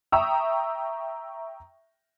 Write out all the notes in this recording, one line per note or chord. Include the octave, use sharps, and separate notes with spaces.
E5 G5 A#5 C#6 D#6 E6